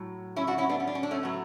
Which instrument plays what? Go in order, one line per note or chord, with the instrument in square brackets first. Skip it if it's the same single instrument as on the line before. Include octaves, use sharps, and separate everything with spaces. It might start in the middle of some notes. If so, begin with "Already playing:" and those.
Already playing: [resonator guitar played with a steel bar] A2 F#3
C#4 E4
D4 F#4
C#4 E4
B3 D4
C#4
D4
C#4
D4
A3 C#4
A2 F#3 A3 B3